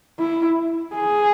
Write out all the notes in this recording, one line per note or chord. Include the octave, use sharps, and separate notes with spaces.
E4
G#4